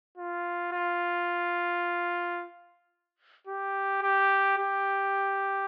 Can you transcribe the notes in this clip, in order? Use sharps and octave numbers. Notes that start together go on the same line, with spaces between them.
F4
F4
G4
G4
G4